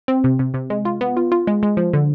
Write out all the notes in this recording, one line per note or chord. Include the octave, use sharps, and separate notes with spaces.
C4
C3
C3
C3
G#3
F4
B3
F4
F4
G#3
G#3
F3
D3